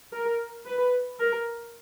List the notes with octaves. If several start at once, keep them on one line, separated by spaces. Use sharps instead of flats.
A#4
B4
A#4